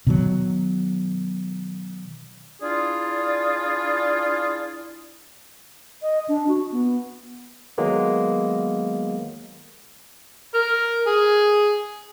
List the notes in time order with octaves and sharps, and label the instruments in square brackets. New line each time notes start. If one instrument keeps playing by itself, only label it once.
[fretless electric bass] B2 D#3 F#3
[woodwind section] D4 E4 F4 G#4 D5
[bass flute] D#5
D4
F#4
B3
[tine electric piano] D#3 F#3 G#3 A#3 B3
[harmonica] A#4
G#4